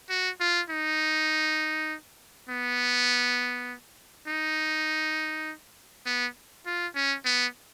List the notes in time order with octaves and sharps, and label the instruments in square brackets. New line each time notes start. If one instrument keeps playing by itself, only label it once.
[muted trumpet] F#4
F4
D#4
B3
D#4
B3
F4
C#4
B3